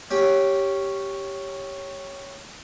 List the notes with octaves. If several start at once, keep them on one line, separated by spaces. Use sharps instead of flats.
C#4 G4